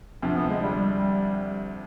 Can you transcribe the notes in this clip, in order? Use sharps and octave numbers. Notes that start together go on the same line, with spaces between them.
D2 C3 F3
B3
G#3
G3
G3